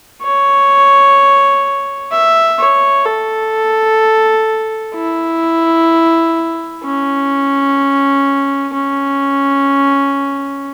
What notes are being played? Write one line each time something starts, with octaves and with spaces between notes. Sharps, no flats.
C#5
E5
C#5
A4
E4
C#4
C#4